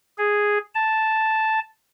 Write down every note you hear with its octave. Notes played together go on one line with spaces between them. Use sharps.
G#4
A5